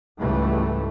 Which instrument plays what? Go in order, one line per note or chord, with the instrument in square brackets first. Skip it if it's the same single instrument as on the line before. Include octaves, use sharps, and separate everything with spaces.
[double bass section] C#2 G#2 E3 G3 A3